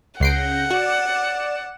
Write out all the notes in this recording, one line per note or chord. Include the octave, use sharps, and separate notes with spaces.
C#2 C#3 F#5 G6 A#6 C7 D7
F#4 D5 E7